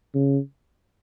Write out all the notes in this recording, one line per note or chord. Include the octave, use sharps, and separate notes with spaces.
C#3